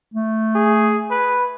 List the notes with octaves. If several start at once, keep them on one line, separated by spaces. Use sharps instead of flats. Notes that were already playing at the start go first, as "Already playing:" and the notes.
A3
G#4
B4